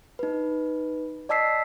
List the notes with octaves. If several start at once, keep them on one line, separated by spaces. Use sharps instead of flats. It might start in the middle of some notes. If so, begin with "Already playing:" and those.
D#4 B4
D5 D#5 A5 E6 B6 C7